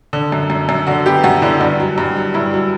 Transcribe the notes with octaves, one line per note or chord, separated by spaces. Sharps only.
D3
F#2
F#2
F#2
D3 F#4
B3 G4
F#2 F#4
D3 E4
G2 D4
F#3
G2
F#3
G2 E4
F#3